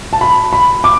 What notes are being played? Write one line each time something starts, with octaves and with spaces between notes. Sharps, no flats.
A5
B5
B5
D6